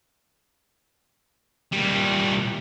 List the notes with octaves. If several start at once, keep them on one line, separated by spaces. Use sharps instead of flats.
A#2 G3